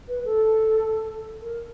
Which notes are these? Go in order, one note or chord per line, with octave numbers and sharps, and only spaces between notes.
B4
A4
A#4